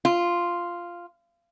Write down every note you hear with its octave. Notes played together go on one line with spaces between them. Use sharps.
F4